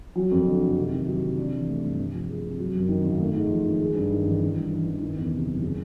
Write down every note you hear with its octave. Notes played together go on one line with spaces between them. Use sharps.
F#3
F2
D3
F#1
C3
D#3
F#3
C3
D4
E3
A3
G2
C3
F3
G#3
C3
F#3
F#2
D#3
G#1
A3
G#2
F3
G#1
G#3
G2
D#3
A1
A1
G2
E3
A1
D#3
E2
C3
F#1
C#3